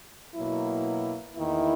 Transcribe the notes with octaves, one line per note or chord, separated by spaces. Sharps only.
B2 F#3 A#3 E4
E2 D#3 A#3 E4